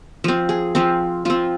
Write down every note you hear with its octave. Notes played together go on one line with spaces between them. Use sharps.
F3 C4
G#4
F3 C4
F3 C4 F4